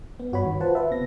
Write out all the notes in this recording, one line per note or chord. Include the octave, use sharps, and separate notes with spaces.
B3
G2 F#4 C#5 B5
D#3
F4 B4 C5 F#5 A5
B4 E5
C3 B3 A#6